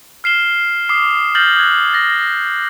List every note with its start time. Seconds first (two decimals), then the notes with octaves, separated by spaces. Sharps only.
0.24 F6 C7 E7 G7
0.89 D6 D#6 C7
1.35 F6 G6 A6 A#6 F#7 G7
1.57 D#6 F#6 G#6
1.93 A6 A#6